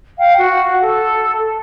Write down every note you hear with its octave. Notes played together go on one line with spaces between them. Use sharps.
F5 G5
F#4 F#5
A4